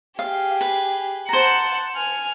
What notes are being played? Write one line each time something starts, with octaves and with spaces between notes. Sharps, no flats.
G4 G#4 F5
B4
C5 F#5 A5 A#5
G#5 F6